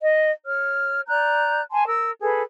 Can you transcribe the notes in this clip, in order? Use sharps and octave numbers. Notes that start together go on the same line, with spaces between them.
D#5
C#5 F6
D5 A#5 F#6 G6
G#5 A5 C6
A#4 E6
G#4 A4 B4